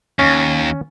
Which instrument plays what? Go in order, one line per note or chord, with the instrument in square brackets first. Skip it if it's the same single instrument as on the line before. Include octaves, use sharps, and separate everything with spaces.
[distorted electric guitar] D#2 [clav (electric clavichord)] C#4